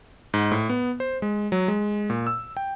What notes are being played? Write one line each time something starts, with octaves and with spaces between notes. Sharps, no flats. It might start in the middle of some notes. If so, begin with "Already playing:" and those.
G#2
A2
B3
C5
G#3
F#3
G#3
A#2
E6
G5